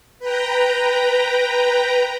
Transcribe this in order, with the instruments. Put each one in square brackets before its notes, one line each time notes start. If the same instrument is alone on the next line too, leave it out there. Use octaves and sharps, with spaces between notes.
[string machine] B4 G5 A#5